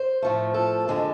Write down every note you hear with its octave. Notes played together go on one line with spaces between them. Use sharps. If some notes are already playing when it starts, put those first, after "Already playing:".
Already playing: C5
A2 F3 A3
A4
F2 D3 G#3